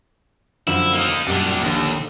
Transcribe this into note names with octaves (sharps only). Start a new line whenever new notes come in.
F#2 D3 F3 E4
A#3 D#4
F#2 A#2 G3 D4
A#1 D#2 D3